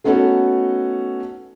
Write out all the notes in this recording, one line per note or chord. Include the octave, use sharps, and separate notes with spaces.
A3 B3 C#4 D#4 F#4 A4